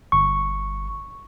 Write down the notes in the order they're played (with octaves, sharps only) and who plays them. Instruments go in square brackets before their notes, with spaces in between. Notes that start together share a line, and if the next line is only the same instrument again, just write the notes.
[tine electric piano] G1 C#6